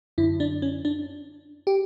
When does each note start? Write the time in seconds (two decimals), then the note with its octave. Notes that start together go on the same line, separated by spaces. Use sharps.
0.18 F#2 D3 E4
0.40 D4
0.62 C#4
0.85 D4
1.67 G4